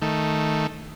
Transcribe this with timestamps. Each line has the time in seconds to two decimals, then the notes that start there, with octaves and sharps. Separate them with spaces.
0.02 D#3 A3